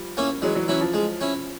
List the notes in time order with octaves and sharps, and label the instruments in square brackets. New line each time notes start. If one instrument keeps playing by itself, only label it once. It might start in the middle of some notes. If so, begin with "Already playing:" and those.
Already playing: [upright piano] F3 G3
[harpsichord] A#3 C#4 E4
[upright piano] E3 F#3 [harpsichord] G#3
[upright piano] E3 F#3
[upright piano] E3 F#3 [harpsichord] C#4 E4
[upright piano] F3
[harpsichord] G#3
C#4 E4